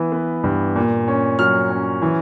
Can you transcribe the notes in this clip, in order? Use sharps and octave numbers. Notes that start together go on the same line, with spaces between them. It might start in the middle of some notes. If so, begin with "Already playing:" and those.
Already playing: E3 B3
B3
G2
A#2
C#4
F#3 F6
C#4
E3